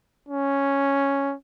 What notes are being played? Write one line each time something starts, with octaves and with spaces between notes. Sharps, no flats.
C#4